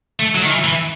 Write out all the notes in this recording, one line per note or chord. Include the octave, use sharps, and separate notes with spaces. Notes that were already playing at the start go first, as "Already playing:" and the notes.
A3
F#3
D#3
E3
E3